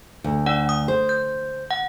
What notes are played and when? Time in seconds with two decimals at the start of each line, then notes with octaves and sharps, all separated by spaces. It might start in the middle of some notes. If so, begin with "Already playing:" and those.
0.24 D2
0.46 D4 D5 F#5
0.69 D#6
0.88 C5
1.09 G6
1.71 F#5